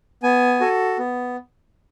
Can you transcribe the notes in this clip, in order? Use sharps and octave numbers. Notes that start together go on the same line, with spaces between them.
B3 G#5
F#4 A4
B3